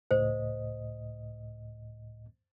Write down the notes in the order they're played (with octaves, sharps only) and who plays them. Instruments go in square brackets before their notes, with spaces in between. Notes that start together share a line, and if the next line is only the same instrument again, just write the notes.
[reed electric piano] C#2 A2 D#5 [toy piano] C5